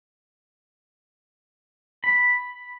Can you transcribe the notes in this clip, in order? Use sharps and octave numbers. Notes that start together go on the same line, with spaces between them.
B5